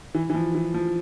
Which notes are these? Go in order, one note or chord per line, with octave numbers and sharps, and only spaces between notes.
E3
E3
F3
E3
F3